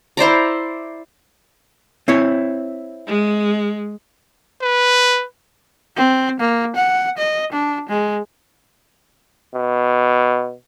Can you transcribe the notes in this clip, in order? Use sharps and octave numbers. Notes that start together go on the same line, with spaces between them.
E4 C5 D5 A#5
C4 E4 C#5
G#3
B4
C4
A#3
F#5
D#5
D4
G#3
B2